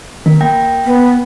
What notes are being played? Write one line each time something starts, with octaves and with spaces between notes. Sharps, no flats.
D#3 A#4
A#3 G5 A#6
B3